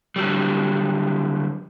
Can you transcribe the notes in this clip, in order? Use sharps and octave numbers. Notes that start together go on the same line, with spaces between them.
D3 F#3 G3